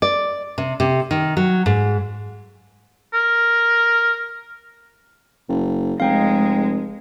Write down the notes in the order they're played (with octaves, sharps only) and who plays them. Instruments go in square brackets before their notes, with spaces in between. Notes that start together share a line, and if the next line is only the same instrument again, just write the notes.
[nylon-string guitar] D5
C3
C3
D#3
F#3
G#2
[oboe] A#4
[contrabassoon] F#1
[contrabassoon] F1 [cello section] G#3 [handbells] F5 G5 A#5